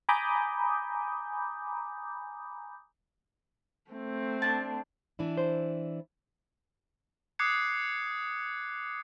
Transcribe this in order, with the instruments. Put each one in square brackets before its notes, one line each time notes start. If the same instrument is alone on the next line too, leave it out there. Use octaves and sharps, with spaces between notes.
[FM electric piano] G#5 A#5 B5 D6 D#6 G6
[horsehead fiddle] A3 C4
[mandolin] D4 A5
[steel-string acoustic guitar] E3 D4 E4
[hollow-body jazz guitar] C5
[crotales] D6 D#6 F#6 G#6 C7 C#7